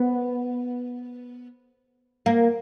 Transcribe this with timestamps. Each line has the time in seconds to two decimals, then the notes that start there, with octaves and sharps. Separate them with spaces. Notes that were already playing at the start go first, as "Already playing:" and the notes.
Already playing: B3
2.26 A#3